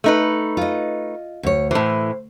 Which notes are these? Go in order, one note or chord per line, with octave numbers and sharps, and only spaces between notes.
A3 D#4 B4
F4 D#5
D2 C#5
A2 E3 C5